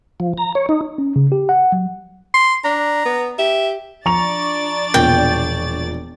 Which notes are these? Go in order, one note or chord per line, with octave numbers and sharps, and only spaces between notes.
F3
A#5
C#5
D#4
C#4
C#3
G4
F#5
F#3
C6
D4 A#5
B3
G4 E5
F3 D4 D5 A#5 C#6 A6 F7
E1 A#2 G5